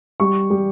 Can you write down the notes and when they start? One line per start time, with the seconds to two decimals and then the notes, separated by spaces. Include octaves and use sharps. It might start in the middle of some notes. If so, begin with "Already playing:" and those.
0.20 G3 C#6
0.50 G3